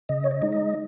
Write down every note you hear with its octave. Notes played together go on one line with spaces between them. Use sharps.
C#3 D#5
C#5
D#5
G#3 D#4
D#5